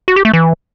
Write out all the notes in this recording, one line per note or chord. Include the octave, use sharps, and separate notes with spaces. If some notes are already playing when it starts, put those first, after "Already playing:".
F#4
G4
A3
E3